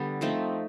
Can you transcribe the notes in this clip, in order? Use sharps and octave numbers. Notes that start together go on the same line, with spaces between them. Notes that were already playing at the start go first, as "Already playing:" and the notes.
Already playing: D3 G3 B3
F3 A3 C4 D#4